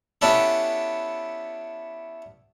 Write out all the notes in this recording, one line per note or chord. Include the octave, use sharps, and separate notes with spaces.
B3 C#4 D4 E4 G4 A4